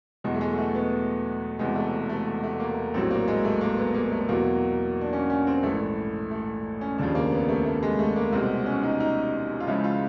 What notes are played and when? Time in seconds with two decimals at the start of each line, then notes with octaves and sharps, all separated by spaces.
0.24 E2 B2 F#3 G#3
0.35 A3
0.41 G#3
0.53 G#3
0.58 A3
0.75 B3
1.59 E1 E2 C3 G#3
1.76 A3
2.09 A3
2.44 A3
2.60 A#3
2.94 A#1 A2 F#3 C4
3.10 A#3
3.28 G#3
3.45 A3
3.61 A#3
3.78 B3
3.94 A#3
4.12 A3
4.29 E2 B2 F#3 A#3
5.01 D4
5.13 C#4
5.30 C#4
5.47 C4
5.63 A#1 G#2 E3 A3
6.31 A3
6.81 C#4
6.98 F1 D#2 C#3 F3 D4
7.15 A#3
7.32 B3
7.49 A3
7.65 A3
7.83 G#3
7.99 A3
8.16 A#3
8.32 C2 B2 G#3 C4
8.66 C#4
8.83 D#4
9.00 D#4
9.60 F4
9.67 C#2 C#3 F3 G#3 E4
9.84 F4